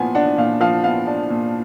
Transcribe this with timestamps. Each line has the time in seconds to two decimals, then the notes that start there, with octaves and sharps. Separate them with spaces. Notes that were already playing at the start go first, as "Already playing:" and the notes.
Already playing: A#2 F3 B3 G#5
0.15 D4 F#5
0.38 A#2 F5
0.61 F3 F5
0.84 B3 F5
1.07 D4
1.30 A#2